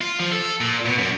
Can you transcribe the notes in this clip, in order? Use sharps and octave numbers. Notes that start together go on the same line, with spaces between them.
F4
F3
A4
A#2
B2
F#2